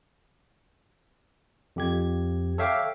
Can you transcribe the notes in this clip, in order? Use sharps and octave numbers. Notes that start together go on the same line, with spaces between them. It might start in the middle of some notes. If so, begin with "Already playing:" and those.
F2 G4 G#6
A4 C#5 E5 F5 G5 D6